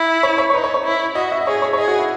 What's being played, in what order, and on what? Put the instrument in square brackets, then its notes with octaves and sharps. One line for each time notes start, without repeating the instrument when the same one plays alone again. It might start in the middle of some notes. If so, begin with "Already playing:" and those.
Already playing: [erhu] E4
[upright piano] C#5
C#5
C#5
[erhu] D#4 [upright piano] B4
[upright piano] C#5
C#5
[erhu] E4
[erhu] F#4 [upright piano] D#5
[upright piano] E5
D#5
[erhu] G#4 [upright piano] C#5
[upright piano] C#5
C#5
[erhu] G#4 [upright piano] D#5
[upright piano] F#4
E4